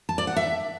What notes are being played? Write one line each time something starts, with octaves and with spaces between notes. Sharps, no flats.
A5
D5
F#5
E5